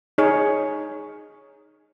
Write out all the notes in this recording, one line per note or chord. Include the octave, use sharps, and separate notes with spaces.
D#4 G#4 C#5